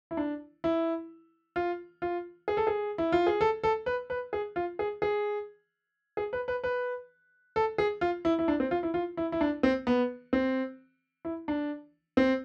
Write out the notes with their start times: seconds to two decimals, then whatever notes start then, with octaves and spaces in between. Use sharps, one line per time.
0.11 E4
0.17 D4
0.64 E4
1.56 F4
2.02 F4
2.48 G#4
2.57 A4
2.67 G#4
2.98 E4
3.12 F4
3.27 G#4
3.41 A4
3.63 A4
3.86 B4
4.10 B4
4.33 G#4
4.56 F4
4.79 G#4
5.02 G#4
6.17 G#4
6.33 B4
6.48 B4
6.64 B4
7.56 A4
7.78 G#4
8.01 F4
8.25 E4
8.39 E4
8.48 D4
8.60 C4
8.71 F4
8.83 E4
8.94 F4
9.17 E4
9.32 E4
9.41 D4
9.63 C4
9.87 B3
10.33 C4
11.25 E4
11.48 D4
12.17 C4